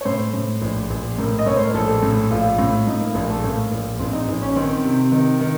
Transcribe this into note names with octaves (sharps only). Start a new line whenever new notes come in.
C#5
A2 C5
A2
A#1
A#1
A2 A#4
D#5
A2 C#5
C5
A#4
A#1 A4
A2
A#1 F4
A2
A2 D#4
A#3
A#1 A#3
A3
A2 A#3
A#1
A#1 C4
D#4
A#1
C#4
D#3 C4
C3
D#3
D#3